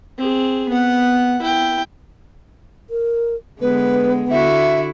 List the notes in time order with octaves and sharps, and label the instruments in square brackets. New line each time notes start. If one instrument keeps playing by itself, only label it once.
[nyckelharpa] C4 G#4
B3 F#5
E4 G5
[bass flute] A#4
[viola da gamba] D3 G#3 [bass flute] B3 [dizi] B4
[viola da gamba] D3 E4 F#4 [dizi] E5